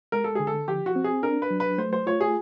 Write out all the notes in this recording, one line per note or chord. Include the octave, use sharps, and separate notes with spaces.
G#3 A#4
A4
D3 G#4
A4
F3 G4
F#4
C4
G#4
D4 A#4
B4
F#3
B4
A3 C5
C5
F4 C#5
G#4